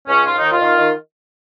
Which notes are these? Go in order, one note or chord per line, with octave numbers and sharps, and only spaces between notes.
C#2 C#4
D#2 F4
D#3 D#4
F4
D#3
D#3